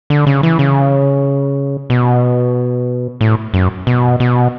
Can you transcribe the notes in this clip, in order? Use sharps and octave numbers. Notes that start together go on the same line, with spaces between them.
D3
C#3
E3
C#3
B2
A2
F#2
B2
B2